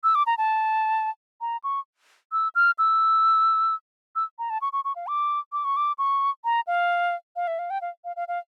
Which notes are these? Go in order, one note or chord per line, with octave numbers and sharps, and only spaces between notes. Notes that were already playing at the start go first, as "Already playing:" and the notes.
E6
D6
A#5
A5
A#5
C#6
E6
F6
E6
E6
A#5
A5
C#6
C#6
C#6
F5
D6
D6
C#6
D6
C#6
A#5
F5
F5
E5
F5
G5
F5
F5
F5
F5